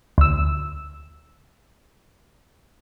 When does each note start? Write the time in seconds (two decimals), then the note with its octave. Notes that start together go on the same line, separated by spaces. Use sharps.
0.18 D2 E6